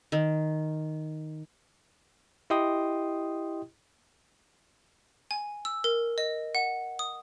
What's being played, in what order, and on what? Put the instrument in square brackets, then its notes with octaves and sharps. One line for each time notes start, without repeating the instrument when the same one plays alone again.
[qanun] D#3
[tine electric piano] E4 G4 D#5 G5 C6 D#6
[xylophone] G#5
E6
A#4
D#5
F#5
D#6